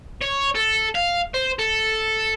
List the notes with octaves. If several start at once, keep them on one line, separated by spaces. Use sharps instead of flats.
C#5
A4
F5
C5
A4